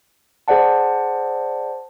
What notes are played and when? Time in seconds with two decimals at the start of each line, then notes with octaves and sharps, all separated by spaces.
0.48 G#4 C5 D5 F#5 A5